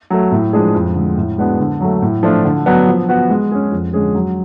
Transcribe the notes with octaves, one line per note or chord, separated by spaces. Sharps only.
F#3 A3
A2
F3 G#3 D4 G#4
F2
D3 G#3
A2
G#3 B3 D4 F#4
D3
F#3 A3
A2
F3 A3 D4 F4
D3
F#3 B3 D4
F3
B3 F#4
G#3
C#4 G#4
F2
D3 G#3 C#4 G#4
F#3